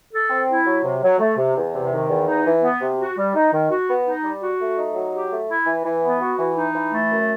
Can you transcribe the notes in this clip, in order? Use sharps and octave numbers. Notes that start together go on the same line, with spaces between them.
A4
C4
E4
F#3
C3
F#3
A3
C3
E2
C3
D#3
E2
D#4
E3
B3
C3
F#4
G3
D#4
D#3
F#4
B3
D#4
G3
F#4
A3
D#4
F#3
G4
A3
E4
E3
E3
B3
F#4
E3
D#4
E3
A3
F#2